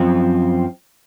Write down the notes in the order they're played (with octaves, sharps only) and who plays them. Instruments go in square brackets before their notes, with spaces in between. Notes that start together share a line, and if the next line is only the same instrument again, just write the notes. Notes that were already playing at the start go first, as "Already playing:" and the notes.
Already playing: [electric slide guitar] F#2 F3 C4